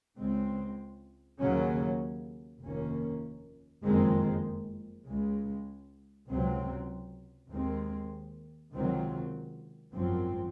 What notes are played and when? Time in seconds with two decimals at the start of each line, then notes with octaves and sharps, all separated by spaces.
0.18 C#2 C#3 G#3 C4
1.40 D#2 C#3 F#3 C#4
2.62 F1 D#2 D#3 A#3 C#4
3.84 F#1 F2 D#3 G#3 C4
5.06 C#2 C#3 G#3
6.29 C#2 C3 F#3 C4
7.50 D#2 D#3 G#3 C4
8.73 C#2 C3 D#3 F#3 C4
9.94 G#1 F#2 F3 C4